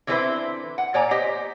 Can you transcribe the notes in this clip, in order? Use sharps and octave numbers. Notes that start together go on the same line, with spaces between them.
D3 E3 C4 E4 B4 C5
F#5
A#2 C#5 D5 G#5 A#5
G4 C5 D#5